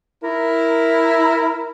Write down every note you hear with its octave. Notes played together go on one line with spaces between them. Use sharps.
E4 A#4